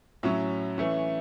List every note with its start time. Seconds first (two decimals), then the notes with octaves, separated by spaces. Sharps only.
0.23 A2 F#3 C#4 E5
0.78 E3 A3 C#4